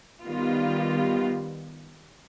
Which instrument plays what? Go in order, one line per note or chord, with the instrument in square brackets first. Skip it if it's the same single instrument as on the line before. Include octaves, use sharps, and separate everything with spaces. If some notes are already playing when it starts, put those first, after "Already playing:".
[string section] D#3 G3 B3 F4